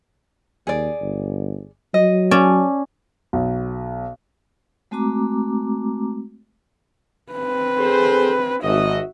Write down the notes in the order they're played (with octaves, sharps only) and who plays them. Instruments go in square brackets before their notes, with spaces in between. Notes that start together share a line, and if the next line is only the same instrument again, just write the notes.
[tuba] D#2 [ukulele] G#4 D5
[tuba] G1
[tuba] F#3 [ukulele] D#5
[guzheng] C#4 D5 A5
[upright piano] B1
[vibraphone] G#3 A3 C4 F#4 A#5 D6
[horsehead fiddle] C4 B4
[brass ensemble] G#4 A4 C5
[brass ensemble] G#1 D#5 [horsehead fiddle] F#4 E5